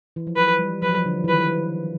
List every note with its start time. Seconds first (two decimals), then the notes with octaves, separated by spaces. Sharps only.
0.16 E3
0.27 F3
0.36 F#3 B4
0.59 G3
0.82 F3 B4
0.89 F#3
0.97 F3
1.05 D3
1.24 E3
1.28 D#3 B4